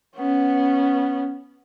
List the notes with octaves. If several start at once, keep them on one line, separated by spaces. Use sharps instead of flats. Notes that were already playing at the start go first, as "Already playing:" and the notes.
B3 C#4